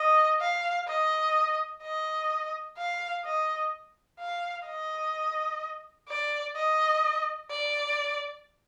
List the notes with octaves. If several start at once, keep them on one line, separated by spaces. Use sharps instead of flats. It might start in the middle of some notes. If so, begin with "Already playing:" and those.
Already playing: D#5
F5
D#5
D#5
F5
D#5
F5
D#5
D5
D#5
D5